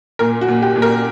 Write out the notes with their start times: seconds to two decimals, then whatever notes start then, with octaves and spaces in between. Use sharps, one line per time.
0.19 A#2 A#4
0.41 F#4
0.48 A#2
0.62 G4
0.76 A#2
0.82 A#4